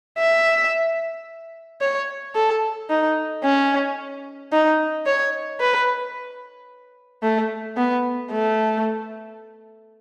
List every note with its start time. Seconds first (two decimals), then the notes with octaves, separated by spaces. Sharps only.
0.18 E5
1.81 C#5
2.35 A4
2.90 D#4
3.44 C#4
4.52 D#4
5.06 C#5
5.60 B4
7.23 A3
7.77 B3
8.31 A3